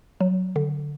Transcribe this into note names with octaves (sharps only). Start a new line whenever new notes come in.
F#3
D3